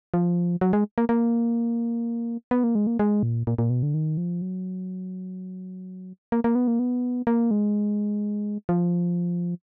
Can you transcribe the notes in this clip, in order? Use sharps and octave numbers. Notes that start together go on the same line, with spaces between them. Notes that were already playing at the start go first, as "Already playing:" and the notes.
F3
F#3
G#3
A#3
A#3
B3
A#3
G#3
A#3
G#3
A#2
A#2
A#2
B2
D3
D#3
F3
F#3
A#3
A#3
B3
A#3
B3
A#3
G#3
F3